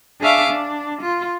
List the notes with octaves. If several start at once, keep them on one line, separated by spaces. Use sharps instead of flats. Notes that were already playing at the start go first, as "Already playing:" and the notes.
D4 G#4 E5 F5 C#6 D6
D4
F4